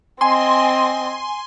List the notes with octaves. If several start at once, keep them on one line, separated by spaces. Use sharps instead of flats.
C4 D#5 G#5 C6